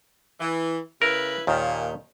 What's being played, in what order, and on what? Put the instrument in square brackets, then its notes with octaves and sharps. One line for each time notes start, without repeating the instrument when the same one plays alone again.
[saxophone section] E3
[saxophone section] C#3 E4 B4 [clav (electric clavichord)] A#4
[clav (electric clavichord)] D#2 D#3 [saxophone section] A#2